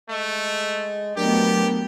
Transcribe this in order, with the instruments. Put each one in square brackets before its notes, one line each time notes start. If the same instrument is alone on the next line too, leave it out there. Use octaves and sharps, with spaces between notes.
[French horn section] G#3 D#5 [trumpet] A3
[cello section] F#3 A3 B3 [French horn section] D4 A#4 [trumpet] G4